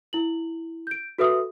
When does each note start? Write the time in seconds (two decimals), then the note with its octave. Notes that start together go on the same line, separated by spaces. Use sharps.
0.13 E4 F#7
0.87 G6 D7
1.18 F#4 A4 B4 E5 D#6